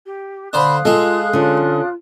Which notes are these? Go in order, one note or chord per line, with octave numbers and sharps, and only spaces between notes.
G4
D3 C5 F5 B5 D#6 F#6
G#3 F4 G#4 A4
D3 C#4 F4